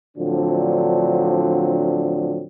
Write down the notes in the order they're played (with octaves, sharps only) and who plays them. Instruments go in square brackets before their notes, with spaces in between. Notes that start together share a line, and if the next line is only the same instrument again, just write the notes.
[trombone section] A2 D3 F3 F#3 C4 D4